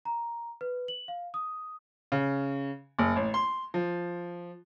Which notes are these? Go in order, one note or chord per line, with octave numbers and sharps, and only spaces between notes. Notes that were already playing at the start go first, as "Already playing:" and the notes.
A#5
B4
F#7
F5
D#6
C#3
F#1
A1
C6
F3